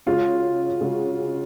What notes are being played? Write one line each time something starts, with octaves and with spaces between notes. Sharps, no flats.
C#3 G#3 C#4 F4 F#4
C#3 G#3 C#4 F#4